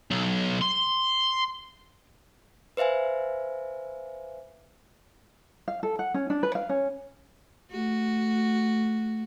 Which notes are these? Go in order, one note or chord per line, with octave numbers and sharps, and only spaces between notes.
B1
C6
B4 C5 E5 F5 G#5
F5
A4
F#5
C#4
D4
B4
F5
C#4
A3 F#4